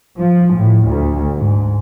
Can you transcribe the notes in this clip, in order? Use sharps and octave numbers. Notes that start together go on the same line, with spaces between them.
F3
A2
D2
G#2